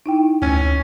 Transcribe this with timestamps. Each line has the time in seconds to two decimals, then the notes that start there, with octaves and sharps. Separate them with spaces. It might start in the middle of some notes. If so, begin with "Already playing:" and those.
0.06 D#4 E4 G5
0.42 D2 C#4